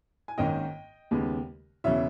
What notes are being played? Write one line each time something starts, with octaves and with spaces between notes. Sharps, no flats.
G#5
G#1 G#2 D#3 A#3 C#4 D#5 G5
D#2 C#3 G#3 B3
E1 C#3 E3 C#5 E5